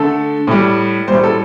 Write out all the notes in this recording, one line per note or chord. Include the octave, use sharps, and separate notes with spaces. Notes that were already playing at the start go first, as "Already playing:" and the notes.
Already playing: D3 A3 A4
A2 G3
A2 G3 C5
A4